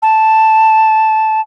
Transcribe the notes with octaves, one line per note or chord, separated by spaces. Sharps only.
A5